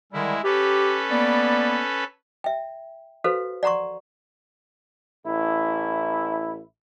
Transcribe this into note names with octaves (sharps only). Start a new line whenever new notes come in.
D3 D#3 G3 G#3 E4
C#4 G4 A4 B4
A#3 B3 D5
E5 G5
F#4 A4 B4 C5 F5
D5 F#5 A#5 C6 C#6
A1 E4